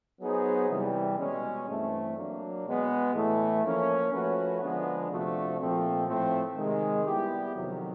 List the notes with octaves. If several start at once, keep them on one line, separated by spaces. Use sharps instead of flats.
F#3 B3 D#4 G#4 C5
C3 E3 G3
B2 G#3 C#4
G2 E3 A3 C4
F#3 A#3 D4
B2 G#3 B3
A2 E3 A3
F3 A#3 C#4
F3 A3 C#4 F#4 B4
D3 F3 G#3 B3 D4
C3 F3 A3 D4 F#4
A#2 F3 A3 C4
A2 F3 A3 C4
C3 D#3 G#3
G3 B3 E4 G4
F2 C3 D#3 F#3